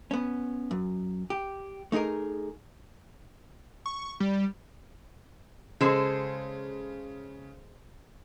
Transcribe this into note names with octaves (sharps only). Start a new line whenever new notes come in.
B3 C#4
F#2
G4
A3 D#4 F#4 G#4 A#4
C#6
G3
C#3 G#3 A4 C5